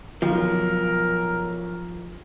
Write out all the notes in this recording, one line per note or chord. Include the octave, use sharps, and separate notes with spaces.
B1 F3 A#4